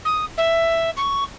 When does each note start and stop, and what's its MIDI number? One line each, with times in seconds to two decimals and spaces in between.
0.05 0.25 87
0.37 0.90 76
0.97 1.24 85